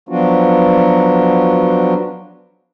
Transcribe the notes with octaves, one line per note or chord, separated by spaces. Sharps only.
F3 F#3 B3 D4 F4 F#4